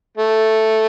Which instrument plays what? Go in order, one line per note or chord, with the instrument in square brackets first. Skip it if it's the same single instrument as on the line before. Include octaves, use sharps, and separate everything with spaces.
[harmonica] A3